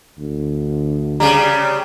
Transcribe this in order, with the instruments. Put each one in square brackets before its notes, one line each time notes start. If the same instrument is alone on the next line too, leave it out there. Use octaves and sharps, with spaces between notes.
[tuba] D2
[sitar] C#3 G3 [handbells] A#5